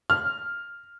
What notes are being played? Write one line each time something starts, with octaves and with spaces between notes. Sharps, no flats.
F6